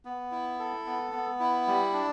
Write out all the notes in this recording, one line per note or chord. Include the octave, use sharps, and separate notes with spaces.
B3
E4
A4
B3
B3
E4
G3
D4